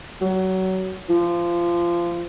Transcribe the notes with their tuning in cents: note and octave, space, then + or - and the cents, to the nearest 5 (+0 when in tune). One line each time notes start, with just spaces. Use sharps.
F#3 +25
F3 -20